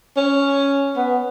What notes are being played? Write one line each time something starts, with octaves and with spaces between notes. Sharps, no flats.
C#4
B3